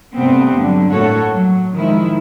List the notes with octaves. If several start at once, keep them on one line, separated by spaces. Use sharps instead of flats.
G2 C3 A3 B3 C4
D3 F#3 G3
A2 A#3 F#4 A4 C#5
F#3
D#3 F3 G#3 E4